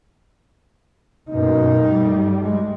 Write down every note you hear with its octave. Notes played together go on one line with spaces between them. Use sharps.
F#2 B2 A#3 D#4
G2 G3 A3
G#3